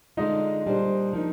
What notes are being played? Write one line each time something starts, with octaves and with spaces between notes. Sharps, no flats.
D3 G#3 D4 D#4 F4
A#2 G3 D4 G#4 C5
F3 A#3 D#4